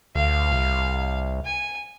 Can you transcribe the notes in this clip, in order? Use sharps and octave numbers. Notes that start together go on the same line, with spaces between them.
D2 F5
C2
G#5